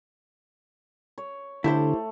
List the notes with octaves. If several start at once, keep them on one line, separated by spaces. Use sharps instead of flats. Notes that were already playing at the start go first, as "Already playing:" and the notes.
C#5
D3 A3 E4 G4 C5